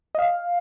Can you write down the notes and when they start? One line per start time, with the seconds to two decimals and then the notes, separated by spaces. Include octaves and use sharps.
0.15 D#5
0.19 F5